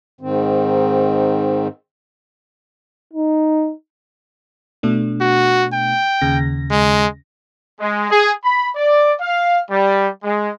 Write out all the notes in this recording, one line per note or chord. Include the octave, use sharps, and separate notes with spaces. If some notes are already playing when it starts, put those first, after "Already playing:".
G#2 D#3 C4
D#4
B2 A3 D4
F#4
G5
D#2 C#3 A#6
G#3
G#3
G#4
B5
D5
F5
G3
G#3